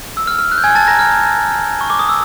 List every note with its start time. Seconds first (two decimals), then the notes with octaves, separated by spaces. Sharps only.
0.17 E6
0.27 F6
0.39 F6
0.52 F#6
0.58 G6
0.64 G#5 G#6
0.75 A5 A6
0.88 A#5 A#6
0.99 F6
1.81 C#6
1.90 D6
1.99 D#6
2.09 E6